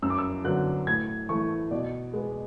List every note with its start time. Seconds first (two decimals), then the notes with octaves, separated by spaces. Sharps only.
0.02 F#2 E6
0.10 D6
0.18 E6
0.44 D3 F#3 B3 F#6
0.87 A2 G#6
1.29 E3 A3 C#6
1.71 B2 D5
2.13 G#3 B3